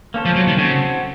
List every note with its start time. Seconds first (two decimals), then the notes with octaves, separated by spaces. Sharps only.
0.14 A#3 C#4 A4 C5
0.25 F3
0.36 F#3
0.47 D#3
0.57 C#3 C4 F#4 A4